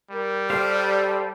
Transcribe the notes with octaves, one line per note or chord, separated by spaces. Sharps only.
G3 A#4
G4 A4 C5 D5 F5